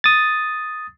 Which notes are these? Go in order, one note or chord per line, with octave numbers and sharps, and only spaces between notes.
D#6 A6